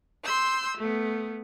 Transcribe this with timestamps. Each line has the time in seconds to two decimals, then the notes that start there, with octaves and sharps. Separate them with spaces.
0.24 C6 E6 G6
0.77 A3 B3